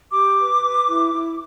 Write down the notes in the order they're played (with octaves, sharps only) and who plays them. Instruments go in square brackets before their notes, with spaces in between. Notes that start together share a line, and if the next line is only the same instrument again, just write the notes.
[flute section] G4 D6
B4
B4
E4
E4